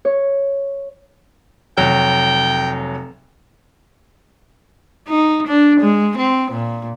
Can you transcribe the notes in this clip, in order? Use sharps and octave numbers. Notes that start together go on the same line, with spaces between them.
C#5
F1 F#3 G5
D#4
D4
G#3
C4
A#2